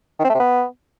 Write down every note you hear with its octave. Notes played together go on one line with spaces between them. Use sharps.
D#3
C4
A3
C3
B3